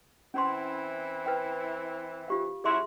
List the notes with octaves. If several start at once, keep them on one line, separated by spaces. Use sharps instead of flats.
E3 C4 C#4 E4 G#5 C6
B4 G5 G#5
F4 G4 F5
F#3 C#4 E4 G#4 E5 C6